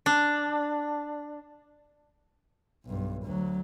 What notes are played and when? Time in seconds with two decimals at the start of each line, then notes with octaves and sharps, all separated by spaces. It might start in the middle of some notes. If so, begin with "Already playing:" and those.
0.06 D4
2.86 B1 G2
3.25 D2 F#3